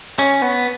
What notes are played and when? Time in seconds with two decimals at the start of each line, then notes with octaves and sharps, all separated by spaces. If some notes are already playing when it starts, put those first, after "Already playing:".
0.19 C#4
0.42 B3